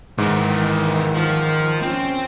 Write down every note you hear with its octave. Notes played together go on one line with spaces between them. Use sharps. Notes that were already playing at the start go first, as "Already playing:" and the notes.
G#2 D#3 E3 D#4
D#3 F3
C4 C#4